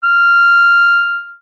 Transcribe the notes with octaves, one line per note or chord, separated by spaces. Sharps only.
F6